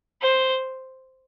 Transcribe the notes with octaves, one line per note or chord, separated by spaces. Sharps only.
C5